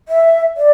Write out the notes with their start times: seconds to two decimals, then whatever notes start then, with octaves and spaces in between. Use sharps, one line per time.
0.08 E5
0.57 D5